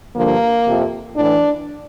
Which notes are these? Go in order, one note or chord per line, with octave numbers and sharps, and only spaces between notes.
G2 D3 F3 A#3
F2 C3 F3
A2 E3 D4